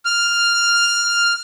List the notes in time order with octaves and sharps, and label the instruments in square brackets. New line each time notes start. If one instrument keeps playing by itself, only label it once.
[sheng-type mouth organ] F6